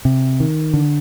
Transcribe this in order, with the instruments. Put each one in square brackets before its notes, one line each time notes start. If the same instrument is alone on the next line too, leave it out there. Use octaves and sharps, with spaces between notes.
[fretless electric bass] C3
D#3
D3